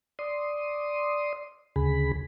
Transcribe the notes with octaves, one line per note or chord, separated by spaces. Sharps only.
D5 C6 D#6
D2 C#3 G#4 B5